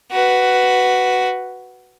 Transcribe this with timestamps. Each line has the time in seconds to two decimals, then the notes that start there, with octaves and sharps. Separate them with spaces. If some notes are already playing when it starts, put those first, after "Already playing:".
0.11 F#4 B4